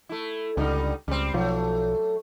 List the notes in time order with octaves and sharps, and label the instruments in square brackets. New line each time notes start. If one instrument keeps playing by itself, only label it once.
[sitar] A3 E4
[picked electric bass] C#2 [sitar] D3 G3 D#4
[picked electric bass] C#2 [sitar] G3 C4
[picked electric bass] B1 F3 [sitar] F#3 A3